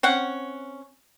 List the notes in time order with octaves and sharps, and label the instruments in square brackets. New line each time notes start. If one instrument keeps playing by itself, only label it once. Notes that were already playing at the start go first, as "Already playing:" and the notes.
[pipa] C4 C#4 F#5